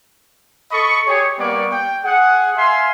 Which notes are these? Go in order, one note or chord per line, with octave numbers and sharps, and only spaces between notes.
A4 D#5 B5 C#6
G4 G#4 C#5
G3 A#3 B3 D5 C#6
G5
G#4 F#5
E5 F5 G#5 C6